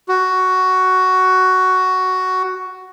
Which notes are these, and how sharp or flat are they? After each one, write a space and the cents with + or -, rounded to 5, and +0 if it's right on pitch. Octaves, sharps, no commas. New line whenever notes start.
F#4 +10